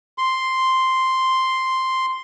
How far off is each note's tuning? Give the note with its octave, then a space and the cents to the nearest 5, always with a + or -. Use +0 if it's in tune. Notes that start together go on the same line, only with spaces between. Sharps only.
C6 +0